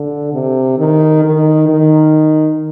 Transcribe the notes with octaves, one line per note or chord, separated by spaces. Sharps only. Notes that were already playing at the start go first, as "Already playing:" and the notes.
Already playing: D3
C3
D#3
D#3
D#3